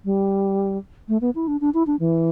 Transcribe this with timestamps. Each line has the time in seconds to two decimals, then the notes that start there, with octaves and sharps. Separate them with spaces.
0.05 G3
1.08 A3
1.21 B3
1.35 E4
1.48 D4
1.61 D4
1.74 E4
1.87 D4
1.99 E3